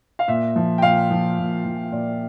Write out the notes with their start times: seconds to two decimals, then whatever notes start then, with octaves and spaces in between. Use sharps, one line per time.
0.19 F5
0.28 A#2 E5
0.56 F3
0.78 G5
0.82 A#2 F5
1.11 F3
1.38 A#2
1.65 F3
1.92 A#2 D5